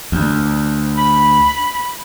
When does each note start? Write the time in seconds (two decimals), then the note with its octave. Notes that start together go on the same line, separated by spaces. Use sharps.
0.12 D2
0.96 B5